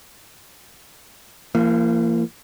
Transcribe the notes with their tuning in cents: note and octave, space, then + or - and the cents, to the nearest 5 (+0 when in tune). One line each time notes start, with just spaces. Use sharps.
E3 +45 A#3 -20